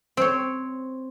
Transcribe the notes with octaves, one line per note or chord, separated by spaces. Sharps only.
C4 C#5